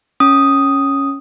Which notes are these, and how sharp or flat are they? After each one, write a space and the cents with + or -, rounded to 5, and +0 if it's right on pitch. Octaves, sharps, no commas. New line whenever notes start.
C#4 +0 D#6 +0